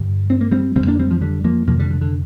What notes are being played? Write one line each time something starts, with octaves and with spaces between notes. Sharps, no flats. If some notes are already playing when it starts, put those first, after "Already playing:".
Already playing: G2 D3 G3
C4
A#3
G3 C4
F2 D3 G3 C4
A#3 D4
G3 C4
F3
D3 G3
F3 A#3
F2 C3 F3 A#3
D3 G3
D3
D3